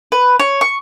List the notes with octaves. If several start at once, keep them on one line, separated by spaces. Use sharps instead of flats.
B4
C#5
C#6